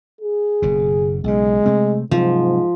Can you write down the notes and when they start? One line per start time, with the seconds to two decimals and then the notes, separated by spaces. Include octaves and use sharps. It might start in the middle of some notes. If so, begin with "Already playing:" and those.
0.21 G#4
0.62 F#1 B2
1.24 B1 C#3 G#3
1.66 C3 A3 C4
2.11 G#2 C3 F3 F#3